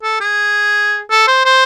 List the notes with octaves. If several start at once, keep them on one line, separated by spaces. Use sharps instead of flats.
A4
G#4
A4
C5
C5